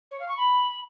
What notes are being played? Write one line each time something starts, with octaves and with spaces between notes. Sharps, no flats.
C#5
F5
C#6
B5